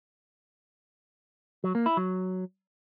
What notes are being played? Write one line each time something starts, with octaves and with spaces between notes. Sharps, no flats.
F#3
A#3
E4
F#3